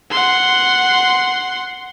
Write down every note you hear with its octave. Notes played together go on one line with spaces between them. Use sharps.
F#5 C6